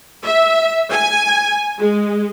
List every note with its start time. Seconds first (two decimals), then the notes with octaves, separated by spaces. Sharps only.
0.25 E5
0.91 G#5
1.79 G#3